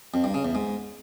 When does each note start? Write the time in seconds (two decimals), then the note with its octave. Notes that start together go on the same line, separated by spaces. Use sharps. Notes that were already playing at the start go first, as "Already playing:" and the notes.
0.14 F2
0.24 G2
0.34 C#3
0.45 E2
0.55 G#2